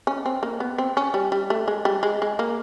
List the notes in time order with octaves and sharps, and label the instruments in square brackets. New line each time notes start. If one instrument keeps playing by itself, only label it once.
[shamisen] C#4
C4
A#3
B3
C4
C#4
G3
G3
A3
G#3
G3
G#3
G#3
A#3